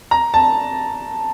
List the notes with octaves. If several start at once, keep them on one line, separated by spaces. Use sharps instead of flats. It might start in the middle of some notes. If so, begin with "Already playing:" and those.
A#5
A5